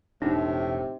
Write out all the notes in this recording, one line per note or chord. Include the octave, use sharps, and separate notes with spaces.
E1 A2 C3 D4 D#4